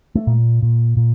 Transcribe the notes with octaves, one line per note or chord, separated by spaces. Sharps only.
A3
A#2
A#2
A#2